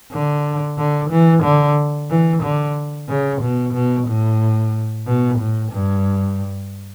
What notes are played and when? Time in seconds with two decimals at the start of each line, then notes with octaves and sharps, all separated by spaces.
0.12 D3
0.78 D3
1.10 E3
1.43 D3
2.10 E3
2.43 D3
3.09 C#3
3.42 B2
3.74 B2
4.07 A2
5.07 B2
5.39 A2
5.72 G2